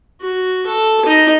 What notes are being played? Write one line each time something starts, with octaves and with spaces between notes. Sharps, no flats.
F#4
A4
D#4 D#5